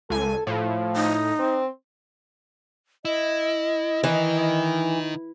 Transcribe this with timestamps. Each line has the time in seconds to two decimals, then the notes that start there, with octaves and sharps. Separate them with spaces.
0.10 C#2 A4 G#5
0.47 A2 F3
0.96 D#4
1.39 C4
3.05 E4 D#5
4.04 D#3 E3 D#4